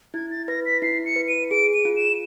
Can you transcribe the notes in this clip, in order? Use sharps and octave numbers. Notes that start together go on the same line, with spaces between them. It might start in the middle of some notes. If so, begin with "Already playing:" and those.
E4 G#6
A6
B4 A#6
B6
E4 C7
C#7
B4
D#7
G#4 D7
D#7
F4
E7